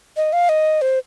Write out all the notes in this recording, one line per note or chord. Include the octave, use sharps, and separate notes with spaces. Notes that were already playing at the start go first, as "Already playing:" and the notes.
D#5
F5
D#5
C5